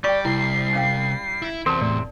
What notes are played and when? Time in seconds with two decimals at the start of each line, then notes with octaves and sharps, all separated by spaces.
0.04 G3 G4 D5 G5 C#6
0.25 C2 E4 C7
0.73 C#4 F5 G5
1.42 E4
1.66 E2 C3 C4 A#4 C5 A5
1.81 A2 D5